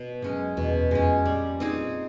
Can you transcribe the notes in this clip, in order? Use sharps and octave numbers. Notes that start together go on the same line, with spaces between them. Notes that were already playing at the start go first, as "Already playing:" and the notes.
Already playing: B2
F#2 G#3 C#4
E2 B2
F2 G#3 C#4
A#2 G3
C4 D#4 G#4